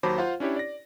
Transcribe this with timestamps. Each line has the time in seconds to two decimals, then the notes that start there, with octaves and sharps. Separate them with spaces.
0.03 D#2 F#3 C5 A5 B5 D6
0.18 F4 C5 F5 F#5
0.40 C#4 D4 E4 G4 C#5
0.56 D5 A#6